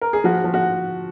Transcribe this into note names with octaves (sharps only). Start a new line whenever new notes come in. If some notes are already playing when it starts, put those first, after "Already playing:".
A#4
G#4
F3 F#4
F3
F#4